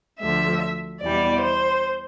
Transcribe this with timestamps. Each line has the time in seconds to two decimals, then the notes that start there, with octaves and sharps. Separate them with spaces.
0.21 D2 D3 F3 E5
1.02 E2 B2 G3 D5
1.43 C5